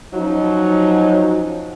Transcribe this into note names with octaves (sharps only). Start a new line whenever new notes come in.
F3 F#3 C#4 D#4